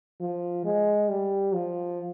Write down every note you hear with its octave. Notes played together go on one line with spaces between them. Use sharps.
F3
G#3
G3
F3